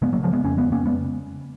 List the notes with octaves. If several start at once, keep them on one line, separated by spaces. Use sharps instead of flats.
C#3 G#3 B3
F#3 A#3
C#3 F3 G#3
G#3 B3
F2 A#3 C#4
G#3 B3
F2
A#3 C#4
C#3 G#3 B3